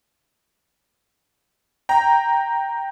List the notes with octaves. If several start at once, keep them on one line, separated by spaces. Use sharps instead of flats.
G5 A#5